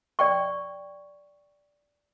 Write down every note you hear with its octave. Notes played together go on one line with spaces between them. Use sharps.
D5 G5 C#6